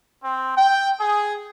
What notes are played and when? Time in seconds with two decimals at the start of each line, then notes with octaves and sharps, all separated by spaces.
0.23 C4
0.57 G5
0.99 G#4